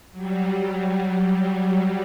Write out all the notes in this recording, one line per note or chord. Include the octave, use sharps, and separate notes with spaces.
F#3 G3